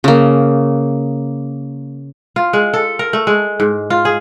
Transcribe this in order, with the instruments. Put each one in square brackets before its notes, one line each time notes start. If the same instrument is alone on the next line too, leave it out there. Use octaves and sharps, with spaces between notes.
[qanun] C#3 A#3
[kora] F4
G#3
A4
A#4
A3
G#3
G#2
F4
G#4